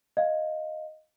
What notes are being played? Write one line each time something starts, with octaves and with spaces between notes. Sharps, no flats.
D#5 F5